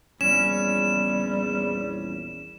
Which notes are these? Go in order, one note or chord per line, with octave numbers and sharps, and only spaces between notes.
A#1 E2 G3 C#4 E7